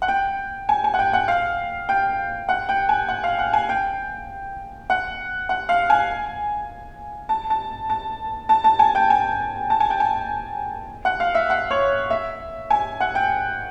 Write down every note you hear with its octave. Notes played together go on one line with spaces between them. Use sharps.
F#5
G5
G#5
G#5
F#5
G5
F#5
F5
G5
F#5
G5
G#5
F#5
F5
F#5
G#5
G5
F#5
F#5
F5
G#5
A5
A5
A5
A5
A5
G#5
G5
G#5
A5
G#5
G5
G#5
F#5
F5
E5
F#5
C#5
E5
G#5
F#5
G5